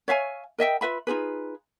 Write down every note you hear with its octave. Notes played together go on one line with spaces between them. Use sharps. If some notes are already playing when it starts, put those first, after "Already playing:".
C#5 E5 F5 G#5
A#4 D#5 E5 G5
F4 B4 E5 B5
D#4 F4 G#4 B4